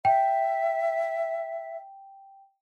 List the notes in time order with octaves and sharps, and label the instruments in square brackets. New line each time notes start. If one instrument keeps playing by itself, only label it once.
[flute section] E5 [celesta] G5